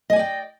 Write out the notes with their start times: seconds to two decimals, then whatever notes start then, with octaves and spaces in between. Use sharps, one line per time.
0.10 D#5
0.13 G#5
0.16 D5
0.19 G5